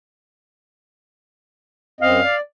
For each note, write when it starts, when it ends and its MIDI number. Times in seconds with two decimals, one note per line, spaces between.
2.01 2.21 42
2.01 2.21 60
2.01 2.21 75
2.01 2.35 77
2.23 2.40 74